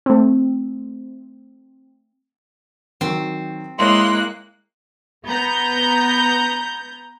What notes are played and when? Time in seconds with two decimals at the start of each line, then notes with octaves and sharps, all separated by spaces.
0.06 A3 C4
3.01 D#3 F#3 C4 F#4
3.79 G#3 A#3 E4 C#5 C6 F#6
5.27 B3 A#5 G6